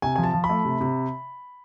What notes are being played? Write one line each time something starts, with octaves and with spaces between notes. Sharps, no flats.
C3 G#5
F3 G#5
A5
F3
B5
A3
C3
C3